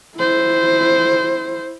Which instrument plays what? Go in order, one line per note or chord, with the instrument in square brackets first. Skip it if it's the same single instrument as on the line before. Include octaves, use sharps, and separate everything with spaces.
[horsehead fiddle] E4 C5